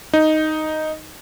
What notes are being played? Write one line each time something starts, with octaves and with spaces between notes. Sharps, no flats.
D#4